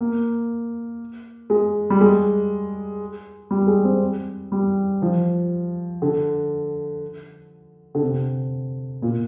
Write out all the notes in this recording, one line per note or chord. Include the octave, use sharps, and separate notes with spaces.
A#3
G#3
G3
G#3
G3
G#3
C4
G3
F3
D3
D3
C3
A#2